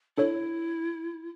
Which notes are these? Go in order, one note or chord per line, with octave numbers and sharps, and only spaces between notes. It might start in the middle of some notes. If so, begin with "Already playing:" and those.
D4 E4 A4 C#5